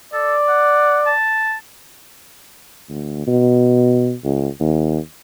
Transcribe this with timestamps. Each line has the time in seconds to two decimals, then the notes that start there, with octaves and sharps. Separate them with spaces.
0.14 A4 D5
0.49 F#5
1.06 A5
2.89 D2
3.27 B2
4.24 C#2
4.60 D#2